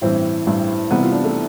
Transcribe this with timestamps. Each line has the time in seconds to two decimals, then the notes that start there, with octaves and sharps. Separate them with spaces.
0.01 A1 G2 E3 C4
0.47 A1 G2 E3
0.90 C2 C3 E3 B3
1.02 F4
1.12 D4
1.24 A3